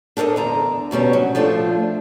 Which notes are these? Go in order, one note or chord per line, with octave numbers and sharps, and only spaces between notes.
D4 A4 A#4 C5 D#5
E2 D3 A#5
D2 B2 G3 C#4
F#3
F3 A3 D4 F4